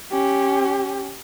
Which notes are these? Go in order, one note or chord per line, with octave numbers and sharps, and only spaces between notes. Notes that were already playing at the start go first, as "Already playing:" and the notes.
C#4 G4